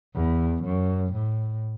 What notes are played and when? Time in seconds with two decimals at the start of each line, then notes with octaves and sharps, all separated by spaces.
0.15 E2
0.64 F#2
1.13 A2